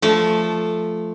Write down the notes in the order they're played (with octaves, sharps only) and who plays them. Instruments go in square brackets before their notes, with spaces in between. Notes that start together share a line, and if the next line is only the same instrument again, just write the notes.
[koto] F3 A3